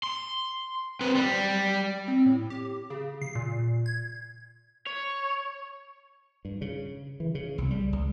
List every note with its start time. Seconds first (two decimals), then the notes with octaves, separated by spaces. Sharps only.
0.03 C6
1.01 C4 B4
1.15 G3
2.08 C4
2.26 A2
2.50 G4
2.90 C#3
3.22 C7
3.36 A#2
3.86 G#6
4.87 C#5
6.45 G2
6.61 C#3
7.20 E3
7.35 C#3
7.58 C2
7.71 G3
7.93 C#2